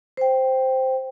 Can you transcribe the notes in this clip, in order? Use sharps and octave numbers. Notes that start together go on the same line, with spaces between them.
C5 G5